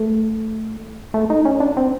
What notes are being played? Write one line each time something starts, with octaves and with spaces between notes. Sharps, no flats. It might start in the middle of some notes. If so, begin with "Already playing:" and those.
Already playing: A3
A3
D#4
C#4
D4
C4